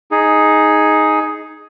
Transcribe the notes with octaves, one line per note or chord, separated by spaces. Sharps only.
D#4 G#4